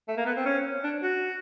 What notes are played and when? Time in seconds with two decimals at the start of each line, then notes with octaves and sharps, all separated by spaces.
0.08 A3
0.17 A#3
0.26 B3
0.37 C4
0.46 C#4
0.83 D4
1.03 F#4